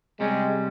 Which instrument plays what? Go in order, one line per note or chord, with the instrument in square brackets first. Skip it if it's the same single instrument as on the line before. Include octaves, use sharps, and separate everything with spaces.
[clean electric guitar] C3 G3 C#4 [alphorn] G#3